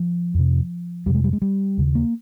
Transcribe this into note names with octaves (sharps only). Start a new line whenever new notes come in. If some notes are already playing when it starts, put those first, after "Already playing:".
Already playing: F3
F2 C3
F2 C3 G3
G#3
G3
G#3
G3
D#2 C#3
A#3